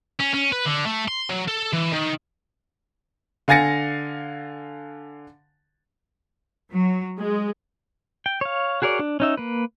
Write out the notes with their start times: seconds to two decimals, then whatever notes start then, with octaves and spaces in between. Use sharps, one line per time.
0.20 C#4
0.34 C#4
0.52 B4
0.66 D3
0.86 A3
1.08 C6
1.29 F#3
1.48 A4
1.73 E3
1.92 D#3
3.48 D3 F5 G#5 A6 A#6 C#7
6.72 F#3
7.18 G#3
8.26 G5
8.41 C#5 F5
8.82 F#4 G#4 A#4 C#5 D5
8.99 D4
9.20 C#4 D#4 E5
9.37 A#3 B4